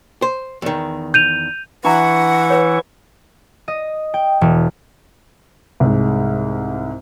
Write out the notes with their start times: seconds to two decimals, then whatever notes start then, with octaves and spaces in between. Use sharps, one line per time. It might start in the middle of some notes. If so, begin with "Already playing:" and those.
0.22 C5
0.62 E2 D#3
1.14 G6 D#7 F7
1.84 E3 D4 E4 F#5 A#5 C#6
2.50 B4 C#5
3.68 D#5
4.14 G5
4.41 E1
5.80 C2 G#2